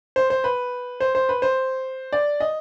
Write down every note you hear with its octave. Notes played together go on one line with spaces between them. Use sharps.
C5
C5
B4
C5
C5
B4
C5
D5
D#5